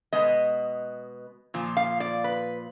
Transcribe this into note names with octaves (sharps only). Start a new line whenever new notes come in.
B2 G#3 B3 D#5
A#2 F3
F5
D5
B4